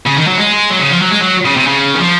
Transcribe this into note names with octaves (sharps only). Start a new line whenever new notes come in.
C#3
D#3
F#3
G#3
F#3
C#3
F3
F#3
G#3
F#3
C#3
C3
C#3
D#3
F3